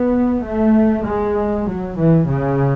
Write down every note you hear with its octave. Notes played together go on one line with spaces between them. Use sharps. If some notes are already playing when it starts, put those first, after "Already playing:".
Already playing: B3
A3
G#3
F#3
E3
C#3